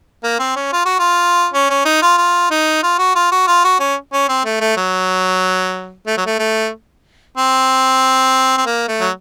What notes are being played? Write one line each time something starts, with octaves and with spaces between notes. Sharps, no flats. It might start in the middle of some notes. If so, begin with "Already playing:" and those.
A#3
C4
C#4
F4
F#4
F4
C#4
C#4
D#4
F4
F4
D#4
F4
F#4
F4
F#4
F4
F#4
C#4
C#4
C4
A3
A3
F#3
A3
F#3
A3
A3
C4
C4
A#3
A3
F#3